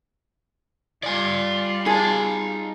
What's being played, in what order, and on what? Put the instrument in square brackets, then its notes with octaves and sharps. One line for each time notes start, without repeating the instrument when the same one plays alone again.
[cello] G3 F4 [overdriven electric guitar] D5 G#5
[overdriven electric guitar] D#4 A5 [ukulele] G#4